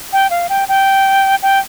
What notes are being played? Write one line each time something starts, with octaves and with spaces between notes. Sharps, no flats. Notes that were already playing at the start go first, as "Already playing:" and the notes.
G5
F5
G5
G5
G5